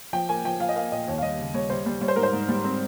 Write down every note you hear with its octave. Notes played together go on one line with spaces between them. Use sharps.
F3 G5
A#3 G#5
F3 G5
F3 F5
D#5
A#3 F5
A#2 D#5
D#2 C#5
F5
G3 D#5
C#3
G3 C#5
G3 C5
G3
G3 C#5
C5
G#2 A#4
C5
G#2
G3
C4